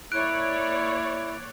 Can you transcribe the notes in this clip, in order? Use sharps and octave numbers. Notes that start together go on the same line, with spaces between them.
A#3 E4 C#5 D5 F#6 D7